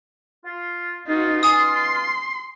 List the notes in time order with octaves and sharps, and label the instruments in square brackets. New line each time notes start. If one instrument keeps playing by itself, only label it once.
[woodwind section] F4
[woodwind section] B2 C#4 F4 [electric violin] D#4 F#4
[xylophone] G#5 D#6 [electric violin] C6